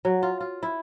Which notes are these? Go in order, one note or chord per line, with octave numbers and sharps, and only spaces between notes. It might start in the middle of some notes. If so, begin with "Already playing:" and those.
F#3
F4
F4
E4